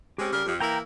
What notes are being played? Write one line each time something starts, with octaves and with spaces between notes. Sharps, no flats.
G#3 C4 C#4 G4
C#3 G3 A#4
F2
E3 A#3 E4 G5 A#5 E6